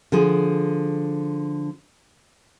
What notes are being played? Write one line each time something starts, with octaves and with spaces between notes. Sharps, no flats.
D3 F3 G#4